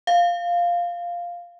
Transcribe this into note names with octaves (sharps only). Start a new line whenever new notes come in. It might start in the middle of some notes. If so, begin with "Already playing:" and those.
F5